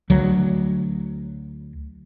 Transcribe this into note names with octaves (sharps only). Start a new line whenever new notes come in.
D2 F#3